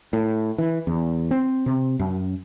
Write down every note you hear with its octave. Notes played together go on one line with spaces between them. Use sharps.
A2
E3
E2
C4
C3
F#2